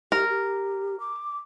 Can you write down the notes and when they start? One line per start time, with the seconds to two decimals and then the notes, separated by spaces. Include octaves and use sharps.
0.12 G4 A#4
0.30 G4
1.00 D6